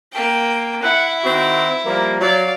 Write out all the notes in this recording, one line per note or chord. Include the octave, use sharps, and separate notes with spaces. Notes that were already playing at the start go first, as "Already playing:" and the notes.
A#3 G5
E4 F#5
D#3 C4 F#4
F3 G3 A#3
F#3 D5 F5